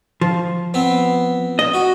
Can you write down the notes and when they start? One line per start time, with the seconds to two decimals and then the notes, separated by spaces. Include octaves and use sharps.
0.21 F3
0.74 B3 C4
1.59 D#5
1.74 F#4